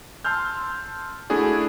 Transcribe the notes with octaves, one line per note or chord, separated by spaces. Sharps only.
A5 C6 E6 F6 G6
A3 D4 E4 F#4 G#4 D5